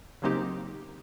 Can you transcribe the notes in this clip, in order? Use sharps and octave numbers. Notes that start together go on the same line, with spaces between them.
C#3 F#3 A#3 C4 D#4 G4